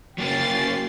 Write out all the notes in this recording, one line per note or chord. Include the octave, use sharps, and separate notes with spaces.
F#3 A#3 C#4 G5 A6 C7